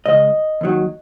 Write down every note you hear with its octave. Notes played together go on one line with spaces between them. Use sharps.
C#2 C#3 G#3 D#5
D#2 D#3 F#3